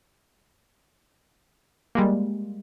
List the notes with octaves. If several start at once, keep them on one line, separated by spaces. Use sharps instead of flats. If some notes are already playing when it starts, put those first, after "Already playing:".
G3 G#3 A#3